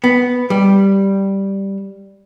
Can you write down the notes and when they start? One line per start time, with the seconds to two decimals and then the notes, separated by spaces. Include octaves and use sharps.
0.04 B3
0.50 G3